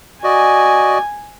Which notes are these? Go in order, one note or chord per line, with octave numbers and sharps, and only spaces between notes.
F#4 D5 D#5 G#5